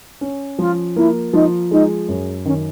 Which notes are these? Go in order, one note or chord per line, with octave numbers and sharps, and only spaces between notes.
C#4
F3 F4
A#3 E4
F3 D#4
G#3 D#4
F#2
D#3 C#4